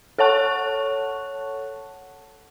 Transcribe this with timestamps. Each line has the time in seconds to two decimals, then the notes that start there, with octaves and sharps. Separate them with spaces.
0.18 A4 C#5 F#5 A5 C#6 F#6